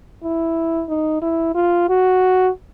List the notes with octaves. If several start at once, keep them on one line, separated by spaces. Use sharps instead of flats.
E4
D#4
E4
F4
F#4